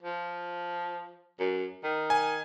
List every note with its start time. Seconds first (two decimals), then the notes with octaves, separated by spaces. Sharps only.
0.02 F3
1.40 F#2
1.84 D#3
2.10 G#5